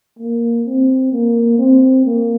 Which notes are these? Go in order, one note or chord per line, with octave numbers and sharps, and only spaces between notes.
A#3
C4
A#3
C4
A#3